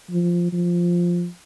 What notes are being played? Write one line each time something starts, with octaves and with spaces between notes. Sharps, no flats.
F3
F3